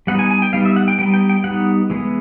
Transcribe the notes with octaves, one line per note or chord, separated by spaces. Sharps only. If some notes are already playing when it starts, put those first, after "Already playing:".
G3 B3 D#4 F#5
G#5
G#5
G5
G3 B3 D#4 F5
E5
F#5
G5
G3 B3 D#4 G5
G5
G5
G3 B3 D#4 F#5
E3 G#3 B3